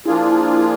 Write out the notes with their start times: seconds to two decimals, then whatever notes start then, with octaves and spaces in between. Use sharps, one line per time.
0.06 F3 A#3 D4 E4 F4 G#4